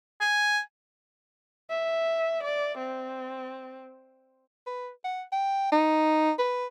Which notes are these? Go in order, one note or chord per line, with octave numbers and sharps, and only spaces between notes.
G#5
E5
D5
C4
B4
F#5
G5
D#4
B4